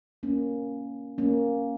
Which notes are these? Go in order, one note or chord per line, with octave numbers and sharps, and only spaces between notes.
A#3 C#4
A#3 C#4